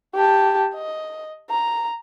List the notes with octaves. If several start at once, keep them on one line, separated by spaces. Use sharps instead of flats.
G4 A5
D#5
A#5